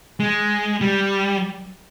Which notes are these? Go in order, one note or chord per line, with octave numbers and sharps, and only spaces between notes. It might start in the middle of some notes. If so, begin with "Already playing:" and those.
G#3
G3